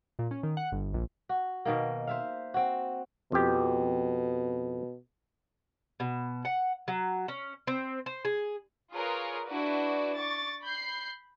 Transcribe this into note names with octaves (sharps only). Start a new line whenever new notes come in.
A#2
C#4
D#3
F#5
G1
A#1
F#4
B2 D#3 A#3
C5 E5 F5
C4 F#4
F2 B2 G4
B2
F#5
F#3
C#4
C4
C5
G#4
F4 G#4 A#4 B4 C#5
D4 E4 F#4 B4 D5
C#6 D6 A6
B5 G6 C7